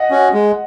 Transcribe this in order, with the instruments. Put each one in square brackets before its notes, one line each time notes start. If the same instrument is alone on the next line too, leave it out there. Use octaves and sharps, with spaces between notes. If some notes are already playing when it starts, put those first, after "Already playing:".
Already playing: [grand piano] D#5 F#5
[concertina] C#4 F#4
G#3